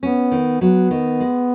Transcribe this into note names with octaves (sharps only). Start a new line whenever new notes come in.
B3 C#4
D#3
F#3 B3
D#3
G#3